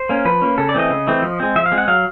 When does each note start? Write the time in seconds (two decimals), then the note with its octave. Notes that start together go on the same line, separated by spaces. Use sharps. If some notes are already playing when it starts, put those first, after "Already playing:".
Already playing: C5
0.09 A#3 C#4
0.25 F3 B4
0.42 A#3 C#4
0.58 C#3 A4
0.69 D5
0.75 E3 A3 C4 D#5
0.90 C#3
1.07 E3 A3 C4
1.22 F3
1.40 G#3 C4
1.56 F3 E5
1.66 F5
1.72 G#3 C4
1.78 F#5
1.88 F#3 F5